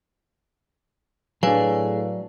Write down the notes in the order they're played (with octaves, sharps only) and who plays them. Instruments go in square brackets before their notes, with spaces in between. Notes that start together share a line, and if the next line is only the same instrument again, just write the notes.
[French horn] A2 [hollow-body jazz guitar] F#3 D4 [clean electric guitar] G#4 [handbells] B4 C#5 F5